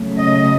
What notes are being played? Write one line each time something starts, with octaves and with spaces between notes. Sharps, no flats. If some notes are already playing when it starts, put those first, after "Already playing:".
Already playing: C#3 F#3 A3
D#5